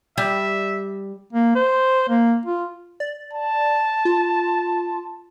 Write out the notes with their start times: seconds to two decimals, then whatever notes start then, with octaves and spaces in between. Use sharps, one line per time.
0.18 G3 E5
1.33 A#3
1.55 C5
2.09 A#3
2.46 F4
3.00 D5
3.33 A5
4.05 F4